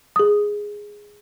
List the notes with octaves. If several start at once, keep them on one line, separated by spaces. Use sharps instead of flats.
G#4 D#6